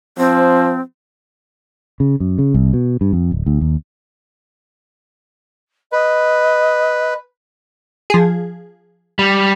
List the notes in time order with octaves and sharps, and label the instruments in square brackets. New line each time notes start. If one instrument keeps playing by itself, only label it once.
[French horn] F3 [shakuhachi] C4
[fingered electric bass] C#3
F#2
C#3
C2
B2
G2
F2
D1
D2
D#2
[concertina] B4 [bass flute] D#5
[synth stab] F3 G#4
[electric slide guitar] G3